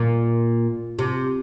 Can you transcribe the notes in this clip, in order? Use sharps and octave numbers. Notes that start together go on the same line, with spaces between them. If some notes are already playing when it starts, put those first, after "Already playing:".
Already playing: A#2
C3